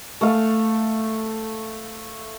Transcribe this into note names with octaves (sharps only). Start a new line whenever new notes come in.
A3 F5